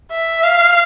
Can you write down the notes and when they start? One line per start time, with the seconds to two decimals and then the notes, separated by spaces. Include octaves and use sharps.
0.12 E5
0.44 F5